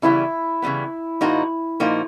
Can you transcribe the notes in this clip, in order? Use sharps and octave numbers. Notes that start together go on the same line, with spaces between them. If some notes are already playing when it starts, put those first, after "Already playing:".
C#3 E3 G3 B3 E4
C#3 E3 G3 B3
A#2 F3 A#3 D#4 F#4
A#2 F3 A#3 D#4 F#4